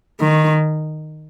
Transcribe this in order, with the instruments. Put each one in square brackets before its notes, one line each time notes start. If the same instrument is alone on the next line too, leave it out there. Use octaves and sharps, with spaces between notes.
[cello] D#3